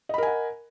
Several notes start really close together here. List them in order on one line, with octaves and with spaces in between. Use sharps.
D#5 B5 A#4 G#5 F#5